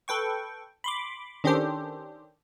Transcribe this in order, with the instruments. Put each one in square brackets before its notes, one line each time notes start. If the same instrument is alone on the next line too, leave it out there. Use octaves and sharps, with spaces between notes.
[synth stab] A4 B4 G5 C#6
B5 C6 D6
D#3 C#4 D4 G4 A4 C5